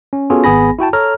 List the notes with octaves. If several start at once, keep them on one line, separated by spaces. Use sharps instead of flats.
C#4
B3 C#4 F4 F#4 G#4 A4
G#1 B3 G#4 G#5 B5 A#6
E4 F#4 G5 A5
A4 C#5 A#5 F6